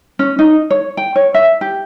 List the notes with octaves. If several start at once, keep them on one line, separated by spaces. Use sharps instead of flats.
C#4
D#4
C#5
G5
C#5
E5
G4